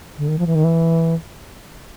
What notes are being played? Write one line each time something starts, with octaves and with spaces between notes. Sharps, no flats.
D3
D#3
F3
E3
D#3
E3